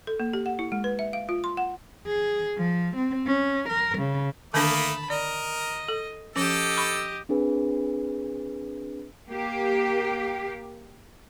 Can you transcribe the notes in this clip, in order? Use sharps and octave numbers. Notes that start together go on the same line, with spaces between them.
A4
A#3
G4
F#5
E4
G#3
B4
E5
F5
F4
C6
F#5
G#4
F3
C4
C#4
A#4
C#3
D3 D#3 A3 A#3 D4 A5 B5 D#6
A#4 D5 D#5
A4
F3 C#4 G4 A4 D#5 E6
B5 C#6 D6
C4 D4 G#4 B4
A#3 G4